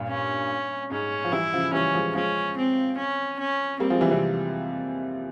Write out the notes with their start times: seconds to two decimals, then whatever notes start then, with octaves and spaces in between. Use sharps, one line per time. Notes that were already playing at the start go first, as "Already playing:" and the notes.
Already playing: G2 A#2
0.08 C#4
0.91 G#2 C#4
1.24 F3
1.32 E3 G3 E4
1.53 C#3 F3
1.73 E3 G3 C#4
1.94 F3 G#3
2.15 F3 G#3 C#4
2.56 C4
2.97 C#4
3.39 C#4
3.80 G3 A#3 C4
3.90 F3 G#3
4.01 E3 G3
4.11 C3 E3